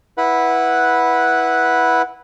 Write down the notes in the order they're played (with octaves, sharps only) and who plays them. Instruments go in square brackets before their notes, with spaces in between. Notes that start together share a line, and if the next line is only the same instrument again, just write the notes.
[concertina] E4 B4 F#5